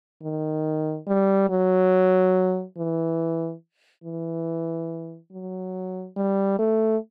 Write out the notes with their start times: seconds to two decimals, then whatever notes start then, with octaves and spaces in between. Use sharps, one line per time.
0.22 D#3
1.07 G3
1.50 F#3
2.77 E3
4.04 E3
5.32 F#3
6.17 G3
6.59 A3